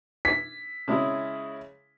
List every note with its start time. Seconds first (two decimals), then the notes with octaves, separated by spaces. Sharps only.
0.25 B6
0.88 C#3 G#3 E4